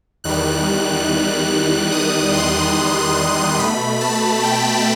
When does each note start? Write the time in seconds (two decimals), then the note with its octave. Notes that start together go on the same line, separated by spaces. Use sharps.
0.24 E2 D#3 G3 F#6
1.92 D#6
2.33 C6
3.58 B2 A3 B5
4.01 A5
4.43 G5